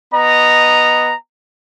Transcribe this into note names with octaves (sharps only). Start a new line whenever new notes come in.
B3 D#5 A#5